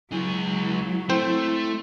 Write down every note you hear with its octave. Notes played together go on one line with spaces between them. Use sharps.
C#2 F#3 E4 G#4
A3 C4 C5